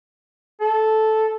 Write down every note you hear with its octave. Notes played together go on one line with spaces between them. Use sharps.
A4